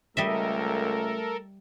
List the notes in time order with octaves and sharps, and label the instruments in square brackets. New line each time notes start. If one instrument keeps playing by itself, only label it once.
[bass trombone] C#2 [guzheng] G3 D#5 E5 [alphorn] A3 [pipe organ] A4 A#4